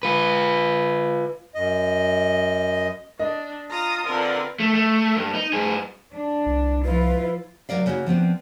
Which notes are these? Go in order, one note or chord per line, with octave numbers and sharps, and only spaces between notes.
F4 B4
F#2 D#5
D4 D#5
F4 A#5 D#6
D3 C4 F4 A#4 B4
A3
A3
G2
D#4
G2 G#4
D4
C2
F3 E4 F4 B4
D2 C3 F#3 A#4 D5 F5
C#3 A#3 F#4
F3 B3 C4 D4